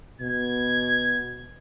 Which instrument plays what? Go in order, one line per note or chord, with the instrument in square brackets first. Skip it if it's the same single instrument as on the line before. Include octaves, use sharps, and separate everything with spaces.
[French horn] B2 [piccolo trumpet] G#6